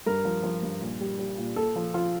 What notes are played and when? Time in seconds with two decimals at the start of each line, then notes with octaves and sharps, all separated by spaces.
0.06 G2 A#4
0.25 F3
0.43 F3
0.63 G2
0.81 A#2
1.01 G3
1.19 G3
1.38 A#2
1.56 A#2 A4
1.76 F3
1.94 F3 F4